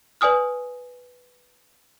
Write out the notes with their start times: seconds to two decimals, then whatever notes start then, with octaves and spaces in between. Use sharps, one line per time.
0.21 B4 D5 G#5 D#6 F6